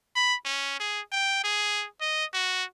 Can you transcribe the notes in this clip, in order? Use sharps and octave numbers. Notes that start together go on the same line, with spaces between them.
B5
C#4
G#4
G5
G#4
D#5
F#4